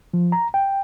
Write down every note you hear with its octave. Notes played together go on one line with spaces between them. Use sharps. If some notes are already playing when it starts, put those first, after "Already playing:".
F3
A#5
G5